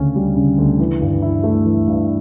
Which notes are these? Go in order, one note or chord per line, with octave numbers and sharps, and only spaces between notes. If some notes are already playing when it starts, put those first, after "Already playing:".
Already playing: D2 C#3 C#4
G3
C#3
D2
E3
G2
E4
A3
E3
G2